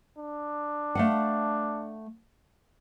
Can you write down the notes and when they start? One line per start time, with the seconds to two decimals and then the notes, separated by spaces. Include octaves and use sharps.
0.18 D4
0.95 A3 F5 F#5